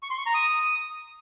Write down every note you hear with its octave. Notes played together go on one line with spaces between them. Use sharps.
C#6
C6
C#6
A#5
D#6